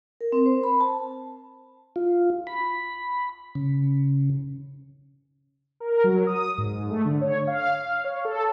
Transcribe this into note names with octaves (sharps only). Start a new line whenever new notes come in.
A#4
C4
C5
B5
A5
F4
B5
C#3
A#4
F#3
D#6
G#2
A3
D3
C#5
F5
C#5
A4